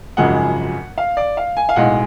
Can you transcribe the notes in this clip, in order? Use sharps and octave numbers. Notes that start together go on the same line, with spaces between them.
G#1 F#2 C#3 F3 G#3 F#5
F5
D5
F5
G#5
F5
B1 A2 G#3 F#5